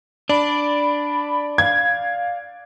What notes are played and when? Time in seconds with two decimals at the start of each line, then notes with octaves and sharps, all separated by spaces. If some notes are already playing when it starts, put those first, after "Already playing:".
0.29 D4 D5 B5
1.58 F5 G#6